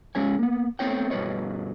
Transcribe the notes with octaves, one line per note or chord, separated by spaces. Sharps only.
G#2 G#3 C#4 C#5 G#5
A#3 B3
A3 B3 C4 C#5 G5
G2 B2 B4 C#5 D#5